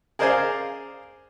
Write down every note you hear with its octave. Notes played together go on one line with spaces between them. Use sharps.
G#4 A#4 C5 D5 F5 G#5